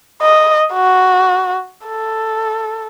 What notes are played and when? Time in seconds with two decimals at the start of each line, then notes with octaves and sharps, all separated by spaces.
0.22 D#5
0.74 F#4
1.87 A4